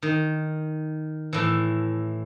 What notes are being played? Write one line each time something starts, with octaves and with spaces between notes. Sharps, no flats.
D#3
A2 E3